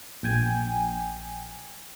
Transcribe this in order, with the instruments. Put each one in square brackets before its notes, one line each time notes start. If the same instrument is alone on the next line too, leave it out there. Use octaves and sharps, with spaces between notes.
[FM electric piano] A#1 G5 G#5